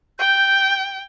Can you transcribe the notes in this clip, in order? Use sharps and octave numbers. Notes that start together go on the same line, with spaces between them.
G5 G6